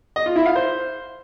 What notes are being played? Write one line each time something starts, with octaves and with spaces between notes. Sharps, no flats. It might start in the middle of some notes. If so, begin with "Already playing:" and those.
D#5
F4
E4
F5
C5